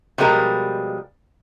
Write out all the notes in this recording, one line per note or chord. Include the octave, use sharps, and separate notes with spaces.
B2 F3 G3 G#3 A#4